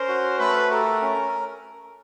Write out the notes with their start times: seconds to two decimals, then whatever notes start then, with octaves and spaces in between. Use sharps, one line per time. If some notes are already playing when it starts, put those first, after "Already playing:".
Already playing: C#4 A#4 C5
0.08 F#4
0.39 A3 A4 B4
0.71 G4 A4 A#4
1.02 C#4